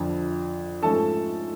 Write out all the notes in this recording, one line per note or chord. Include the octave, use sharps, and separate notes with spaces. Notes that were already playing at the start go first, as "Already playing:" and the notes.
Already playing: F2 D3 F3
G#2 F3 A3 C#4 A4 A5